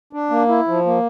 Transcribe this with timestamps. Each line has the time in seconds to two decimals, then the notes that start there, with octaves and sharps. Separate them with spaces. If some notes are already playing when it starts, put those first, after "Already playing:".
0.13 D4
0.30 A#3
0.48 E4
0.68 F3
0.86 A#3